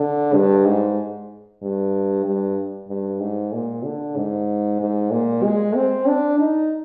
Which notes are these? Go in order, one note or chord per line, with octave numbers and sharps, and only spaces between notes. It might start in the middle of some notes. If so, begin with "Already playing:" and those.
Already playing: D3
G2
G#2
G2
G2
G2
G#2
A#2
D3
G#2
G#2
A#2
G#3
C4
D4
D#4